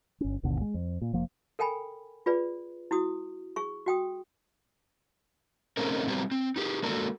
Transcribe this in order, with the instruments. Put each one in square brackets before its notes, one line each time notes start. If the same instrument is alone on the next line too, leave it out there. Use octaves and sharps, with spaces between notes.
[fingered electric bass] G1 C#4
G#1 D#2 B2 D3
G#3
F2
A#2
F1 F3 A#3
[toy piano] A4 A#4 G5 G#5 B5
F4 G#4 B4 D5
E4 F#4 D#6
G#4 C#6
F#4 G5 D#6
[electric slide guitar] A3 C4 C#4 D#4 G#4 A#4
F#3 G3 B3 C4 G4
C4
D#4 G4 G#4
G#3 A#3 D4 F#4 A4